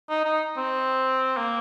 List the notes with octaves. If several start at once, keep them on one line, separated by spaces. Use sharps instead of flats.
D#4
D#4
C4
A#3